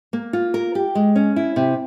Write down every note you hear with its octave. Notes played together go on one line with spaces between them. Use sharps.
A#3
F4
A#4
G4
G#3
C#4
E4
C3